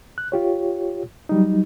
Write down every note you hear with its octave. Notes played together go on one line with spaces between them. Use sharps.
F#6
F4 G4 C#5
F#3 G3 D#4